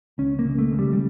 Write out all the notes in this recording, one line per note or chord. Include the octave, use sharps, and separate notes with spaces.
C#2 C#4
A#3
C#3
A3
C#3
G3
G3